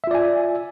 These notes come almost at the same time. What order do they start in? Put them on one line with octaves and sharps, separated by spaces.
E5 F4 D5 G#5